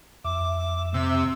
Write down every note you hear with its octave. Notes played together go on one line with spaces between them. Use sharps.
F2 E5 D6
C3 E6